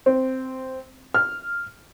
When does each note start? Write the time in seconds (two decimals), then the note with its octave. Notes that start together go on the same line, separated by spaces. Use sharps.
0.06 C4
1.14 F6